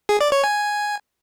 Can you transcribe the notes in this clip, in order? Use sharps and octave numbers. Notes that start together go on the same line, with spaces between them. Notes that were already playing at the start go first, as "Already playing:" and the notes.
G#4
D5
C#5
G#5